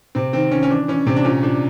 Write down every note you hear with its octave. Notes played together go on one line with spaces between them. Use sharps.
C3 C4
D#3 C4
D#3 C#4
C#4
E3 D4
E3 C#4
C3 C4
D4
A#2 C#4
A#2 D4